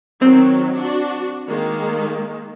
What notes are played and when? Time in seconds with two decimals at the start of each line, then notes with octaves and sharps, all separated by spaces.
0.22 D#3 F#3 C4
0.77 D4 F#4
1.48 D#3 G#3 A#3